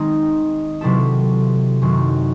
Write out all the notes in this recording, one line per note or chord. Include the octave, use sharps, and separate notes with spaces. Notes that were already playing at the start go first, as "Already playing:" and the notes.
Already playing: D#3 G#3 C4 D#4
C3 F#3 C4 E4 A4
F#2 D#3 F#3 C4